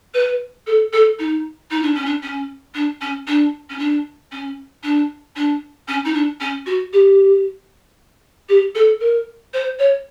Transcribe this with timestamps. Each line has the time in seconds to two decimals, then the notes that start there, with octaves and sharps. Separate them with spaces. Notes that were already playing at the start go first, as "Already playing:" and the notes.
0.14 B4
0.66 A4
0.92 A4
1.18 D#4
1.70 D#4
1.82 D4
1.94 C#4
2.05 D4
2.22 C#4
2.74 D4
3.01 C#4
3.27 D4
3.69 C#4
3.78 D4
4.31 C#4
4.83 D4
5.35 D4
5.87 C#4
6.04 D#4
6.14 D4
6.40 C#4
6.66 F#4
6.92 G4
8.48 G4
8.74 A4
9.00 A#4
9.53 C5
9.78 C#5